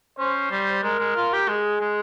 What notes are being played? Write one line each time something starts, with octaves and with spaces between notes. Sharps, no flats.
C#4 C5
G3
G#3 A#4
G#3
F4
G4
G#3 G#4
G#3